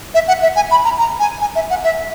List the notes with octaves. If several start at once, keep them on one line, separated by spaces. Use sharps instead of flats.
E5
F#5
E5
G#5
B5
A#5
A#5
G#5
G#5
E5
F#5
E5